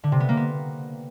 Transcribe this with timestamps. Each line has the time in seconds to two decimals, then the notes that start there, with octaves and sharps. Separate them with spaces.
0.04 D3
0.12 C3
0.20 B3
0.29 A#3
0.37 B3